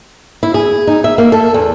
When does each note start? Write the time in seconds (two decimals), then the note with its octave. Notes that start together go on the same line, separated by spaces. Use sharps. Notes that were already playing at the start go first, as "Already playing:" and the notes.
0.43 E4
0.54 G#4
0.87 D#4
1.04 E5
1.18 A#3
1.32 A4
1.54 E2